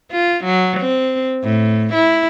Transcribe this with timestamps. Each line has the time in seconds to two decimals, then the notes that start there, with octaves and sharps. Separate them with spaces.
0.11 F4
0.45 F#3
0.80 C4
1.43 A2
1.94 E4